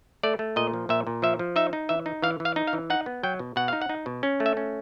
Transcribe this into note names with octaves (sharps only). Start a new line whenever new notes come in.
A3 D5
A3
A#2 D#5
F3
A#2 E5
A#2
F3 E5
F3
D#4 E5
D#4
E3 E5
D#4
E3 F5
E3
F5
D#4
F5
E3
D#4 F#5
B3
F#3 G5
B2
B2 F#5
D#4 F5
F#5
D#4
B2
C#4
A3
E5
C#4